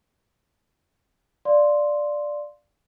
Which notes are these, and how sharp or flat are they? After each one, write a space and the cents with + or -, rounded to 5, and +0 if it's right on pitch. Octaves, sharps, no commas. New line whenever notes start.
D5 +0 F5 +0 C6 +0